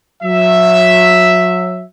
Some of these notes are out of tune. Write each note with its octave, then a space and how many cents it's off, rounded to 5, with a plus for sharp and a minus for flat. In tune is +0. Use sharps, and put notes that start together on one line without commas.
F#3 -30 E5 +0